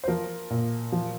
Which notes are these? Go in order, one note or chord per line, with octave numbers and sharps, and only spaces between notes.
C5
F3 A#4
A#2
F3